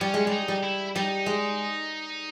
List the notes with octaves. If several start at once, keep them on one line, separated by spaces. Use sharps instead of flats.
G3 C#4
G#3
G3
D#4
G3
E4
G3 D#4
G#3